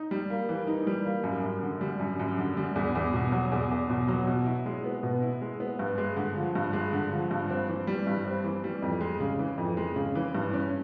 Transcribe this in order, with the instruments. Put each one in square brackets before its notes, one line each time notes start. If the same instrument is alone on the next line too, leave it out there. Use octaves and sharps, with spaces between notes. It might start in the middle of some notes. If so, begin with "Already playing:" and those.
Already playing: [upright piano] D#4
G3
A#3
E3
D#4
G3
A#3
F#2
F#2
D3
G3
F#2
F#2
D3
G3
E2
E2
B2
F#3
E2
E2
B2
F#3
B2
E4
G#3
B3
B2
E4
G#3
B3
G2
G#3
D3
F3
G2
G#3
D3
F3
G2
C4
E3
G3
G2
C4
E3
G3
F2
G#3
C#3
E3
F2
G#3
C#3
E3
G2
C#4